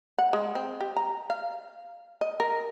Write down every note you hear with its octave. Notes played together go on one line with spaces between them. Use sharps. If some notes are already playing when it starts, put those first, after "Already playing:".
F#5
G#3
C4
G4
A#5
F5
D#5
A#4